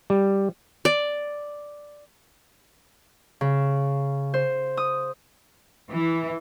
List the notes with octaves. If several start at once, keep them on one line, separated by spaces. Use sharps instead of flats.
G3
D5
C#3
C5
D#6
E3